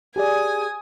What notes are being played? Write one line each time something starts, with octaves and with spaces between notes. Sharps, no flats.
G4 G#4 D5 G#5 D#6